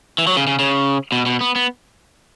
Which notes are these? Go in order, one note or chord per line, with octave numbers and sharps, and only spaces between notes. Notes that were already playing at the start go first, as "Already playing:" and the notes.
E3
F#3
C#3
C#3
C#3
B2
B2
B3
B3